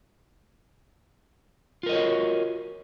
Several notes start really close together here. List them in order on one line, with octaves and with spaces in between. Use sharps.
F4 A#4 D#5 C#5 F#4